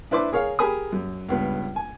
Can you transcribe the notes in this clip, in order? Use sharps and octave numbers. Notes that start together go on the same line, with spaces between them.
D4 E4 B4 C5 E5 D6
G#4 A#4 C#5 F5
G4 G#4 A#4 G#5 B5 D#6
F#2
C#2 G2 B3
G#5